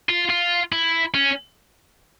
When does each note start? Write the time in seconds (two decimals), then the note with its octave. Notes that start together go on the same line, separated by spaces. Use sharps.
0.09 F4
0.30 F4
0.72 E4
1.14 C#4